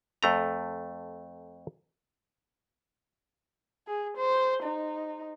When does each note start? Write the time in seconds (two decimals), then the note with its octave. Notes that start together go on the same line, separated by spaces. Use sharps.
0.23 F2 A3 A#5
3.88 G#4
4.17 C5
4.63 D#4